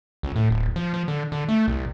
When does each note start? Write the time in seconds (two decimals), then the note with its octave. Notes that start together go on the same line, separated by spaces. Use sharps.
0.23 C#2
0.36 A2
0.50 D1
0.76 F3
0.94 F3
1.08 D3
1.32 D3
1.48 A3
1.68 C2